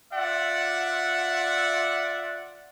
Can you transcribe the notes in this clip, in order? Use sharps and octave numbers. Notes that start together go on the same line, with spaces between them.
F4 D5 E5 F#5